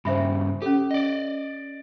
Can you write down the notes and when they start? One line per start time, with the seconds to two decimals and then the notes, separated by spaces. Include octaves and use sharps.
0.05 G2 C#3 C5 E5 B5
0.62 C#4 G4 A4
0.91 D5 D#5